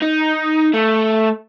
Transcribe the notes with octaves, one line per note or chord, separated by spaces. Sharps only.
D#4
A3